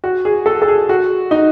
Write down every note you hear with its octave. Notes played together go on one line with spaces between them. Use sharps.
F#4
G#4
A4
A4
G#4
F#4
D#4